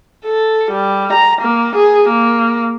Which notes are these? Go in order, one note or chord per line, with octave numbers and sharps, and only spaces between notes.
A4
G3
A#5
A#3
G#4
A#3